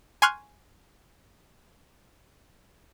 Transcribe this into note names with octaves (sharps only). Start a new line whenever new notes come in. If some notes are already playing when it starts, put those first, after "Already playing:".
G#5 C6 C#6 F6 F#6